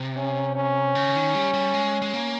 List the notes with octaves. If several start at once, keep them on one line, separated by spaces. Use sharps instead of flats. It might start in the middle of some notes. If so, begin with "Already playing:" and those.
Already playing: C3
C#4
C#4
C#3
D#3
G3
G3
G#3
G#3
A#3